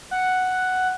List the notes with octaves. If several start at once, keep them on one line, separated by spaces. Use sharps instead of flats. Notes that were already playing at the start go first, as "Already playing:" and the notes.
F#5